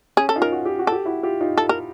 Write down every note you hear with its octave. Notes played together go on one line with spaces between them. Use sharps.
C#4 G#4
A4
D#4 F4
A#4
F#4
G4
F#4
G4 A4
E4 F#4
F4 G4
D#4 F4
A4
A#4